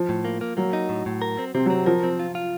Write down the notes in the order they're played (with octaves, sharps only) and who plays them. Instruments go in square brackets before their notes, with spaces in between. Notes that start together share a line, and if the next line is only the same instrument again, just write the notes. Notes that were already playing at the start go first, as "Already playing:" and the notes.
Already playing: [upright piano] F3
[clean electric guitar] A2
A#3
A#3
[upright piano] F#3 [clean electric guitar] A#3
[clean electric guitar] D#4
A2
A2
A#4
C4
[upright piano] C3 [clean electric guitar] C4
[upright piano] F#3 [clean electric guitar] C4
[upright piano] F3 [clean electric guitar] A#4
[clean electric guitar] C4
F4
F4